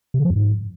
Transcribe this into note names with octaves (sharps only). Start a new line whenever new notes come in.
C3
D3
F3
F#2
G#2